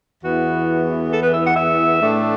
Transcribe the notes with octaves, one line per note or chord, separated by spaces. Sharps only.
E2 E3 B3 E4 F#4
A4
B4
E5
F#5
E5
A2 A3 D4